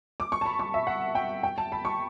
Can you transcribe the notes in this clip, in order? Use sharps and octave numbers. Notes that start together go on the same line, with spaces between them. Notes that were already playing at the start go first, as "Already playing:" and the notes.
D6
C#6
A5
B5
C#6
E5
F#5
G5
G5
A5
B5
C#6